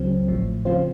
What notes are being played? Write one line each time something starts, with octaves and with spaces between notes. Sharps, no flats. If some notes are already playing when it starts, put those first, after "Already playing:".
Already playing: C#2 C#3 F#3 C4
A1 A2 F3
C#3 F3 C4 F4 C5